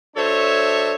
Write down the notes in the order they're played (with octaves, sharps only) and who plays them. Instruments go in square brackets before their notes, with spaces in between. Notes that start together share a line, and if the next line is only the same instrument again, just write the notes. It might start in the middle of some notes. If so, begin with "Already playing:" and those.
[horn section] F#3 D4 A4 C5 C#5 E5